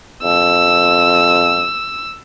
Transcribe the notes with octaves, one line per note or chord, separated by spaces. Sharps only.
F2 E6